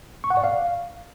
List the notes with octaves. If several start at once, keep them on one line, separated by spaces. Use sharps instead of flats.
C#6
F#5
D5
F5